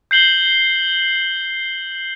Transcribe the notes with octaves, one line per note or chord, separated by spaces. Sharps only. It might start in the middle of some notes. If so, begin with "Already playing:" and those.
G6 C7 F#7 G7